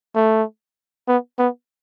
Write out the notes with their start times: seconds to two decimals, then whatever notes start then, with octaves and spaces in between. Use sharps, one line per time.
0.15 A3
1.08 B3
1.39 B3